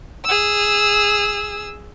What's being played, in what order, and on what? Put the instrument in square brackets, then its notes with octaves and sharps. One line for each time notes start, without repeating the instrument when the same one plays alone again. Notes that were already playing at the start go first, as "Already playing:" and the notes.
[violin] G#4 E6